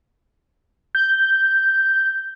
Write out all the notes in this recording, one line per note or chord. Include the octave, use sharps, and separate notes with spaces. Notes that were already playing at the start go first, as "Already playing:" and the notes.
G6